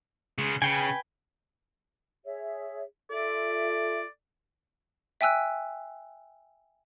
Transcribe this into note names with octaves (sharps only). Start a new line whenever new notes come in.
C#3 G#3
C#3 B4 G5 G#5
G#4 C#5 E5
F4 A4 D5 E5
E5 G5 G#5 E6 F#6